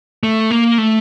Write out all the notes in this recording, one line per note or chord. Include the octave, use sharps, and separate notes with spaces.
A3
A#3
A3